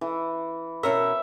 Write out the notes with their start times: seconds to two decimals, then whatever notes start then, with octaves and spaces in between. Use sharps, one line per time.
0.01 E3
0.83 B2 C#4 A#4 E5